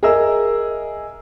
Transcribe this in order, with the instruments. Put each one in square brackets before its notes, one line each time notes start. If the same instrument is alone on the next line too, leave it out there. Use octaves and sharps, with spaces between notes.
[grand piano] G#4 A#4 D#5 E5 E6